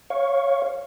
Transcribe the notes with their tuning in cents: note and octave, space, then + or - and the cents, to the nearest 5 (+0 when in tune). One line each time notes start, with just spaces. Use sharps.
C#5 -5 F5 +0 C#6 +0